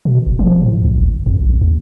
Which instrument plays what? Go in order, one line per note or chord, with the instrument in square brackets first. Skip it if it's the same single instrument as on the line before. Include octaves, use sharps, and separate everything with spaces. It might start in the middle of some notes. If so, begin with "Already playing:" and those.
[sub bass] B2
F#1
F3
A2
C#2
G1
F2
A#1
D#2